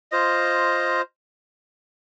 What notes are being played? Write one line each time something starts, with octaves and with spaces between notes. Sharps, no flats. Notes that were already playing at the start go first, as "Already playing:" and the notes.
F4 C5 D#5